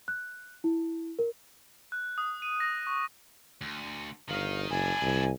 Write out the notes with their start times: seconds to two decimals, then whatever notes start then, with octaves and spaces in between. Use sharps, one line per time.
0.08 F#6
0.64 E4
1.19 A#4
1.92 F#6
2.18 D#6
2.42 D#7
2.60 A#6
2.87 C#6
3.61 D2
4.29 G1 D#3 D#4 F5
4.70 F#1 D4 E4 G#5
5.02 C2